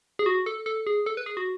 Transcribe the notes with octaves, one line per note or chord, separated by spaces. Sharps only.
G#4
F#4
A4
A4
G#4
A4
B4
G#4
F#4